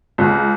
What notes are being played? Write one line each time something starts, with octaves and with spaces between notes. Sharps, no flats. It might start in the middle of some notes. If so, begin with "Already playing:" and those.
C#2